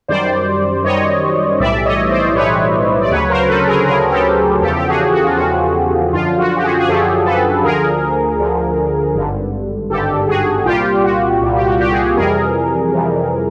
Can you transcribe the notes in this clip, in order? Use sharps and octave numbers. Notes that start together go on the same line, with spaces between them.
F#2 D#3 G3 C5 D5
F#2 D#3 G3 C#5 D#5
B1 A2 E3 G3 D5 E5
C#5 D#5
C5 D5
B1 A2 E3 G3 B4 C#5
D5
D2 C#3 F#3 B4 C#5
A#4 C5
A4 B4
G#4 A#4
D2 C#3 F#3 G#4 A#4
A#4
G4 A4
E2 C#3 F3 G4 A4
G4
F#4 G#4
F#4
F4
E2 C#3 F3 F#4
F#2 D3 F3 F4
F#4
G4
F#4 G#4
G#4
F#2 D3 F3 G4 A4
A4 B4
D2 D3 F3 G#4 A#4
D2 D3 F3
G#1 G2 D3
G#1 G2 D3 G4 A4
F#4 G#4
C2 A#2 G3 F4 G4
F#4
C2 A#2 G3
G4
F#4
G4
F#4 G#4
F2 C3 E3 G3 G#4 A#4
F2 C3 E3 G3